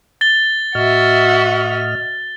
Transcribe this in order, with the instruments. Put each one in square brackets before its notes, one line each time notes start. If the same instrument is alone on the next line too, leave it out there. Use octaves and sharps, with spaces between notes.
[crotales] A6 G7
[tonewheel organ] A2 D#5 F6 [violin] F#4 E5